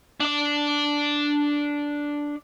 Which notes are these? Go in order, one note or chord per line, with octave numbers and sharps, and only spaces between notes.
D4 D5